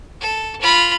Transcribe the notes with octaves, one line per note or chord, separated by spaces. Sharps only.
A4
F4 B5